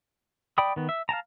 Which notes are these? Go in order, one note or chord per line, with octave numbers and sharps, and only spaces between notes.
D5 G5 B5 D#6
D#3 B3
E5
F5 G5 A5 A#5